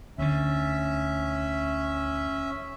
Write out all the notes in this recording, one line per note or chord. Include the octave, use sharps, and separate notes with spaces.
D2 D3 C#4 E5